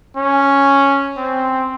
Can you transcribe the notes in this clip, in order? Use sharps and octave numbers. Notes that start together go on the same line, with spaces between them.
C#4
C4